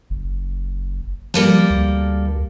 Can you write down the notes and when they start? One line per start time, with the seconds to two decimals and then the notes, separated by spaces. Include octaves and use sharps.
0.10 F#1
1.34 F3 G3 A#3 A4
1.70 D2